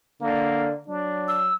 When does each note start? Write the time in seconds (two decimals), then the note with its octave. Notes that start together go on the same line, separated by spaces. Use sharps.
0.22 D3 A#3
0.88 F#3 D4
1.28 E6